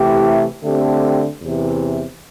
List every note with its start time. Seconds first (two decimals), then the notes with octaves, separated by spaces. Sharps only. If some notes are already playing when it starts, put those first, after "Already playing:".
Already playing: C3 E3 A3 E4 G4
0.63 D3 A3 C4 G4
1.41 E2 C3 E3